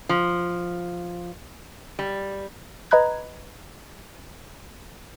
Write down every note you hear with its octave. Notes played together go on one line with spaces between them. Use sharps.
F3
G3
B4 D#5 A#5 B5 F#6 G#6